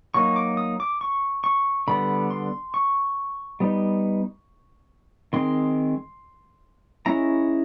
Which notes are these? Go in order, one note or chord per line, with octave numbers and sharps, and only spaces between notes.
F#3 A#3 D#4 C#6
D6
D#6
D6
C#6
C#6
D3 G3 B3 D4 B5
C6
C#6
G3 B3 D#4
D#3 G#3 C4 C6
G#3 C#4 E4 A#5